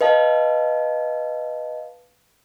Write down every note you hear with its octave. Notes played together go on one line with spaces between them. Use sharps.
B4 D#5 F5 A5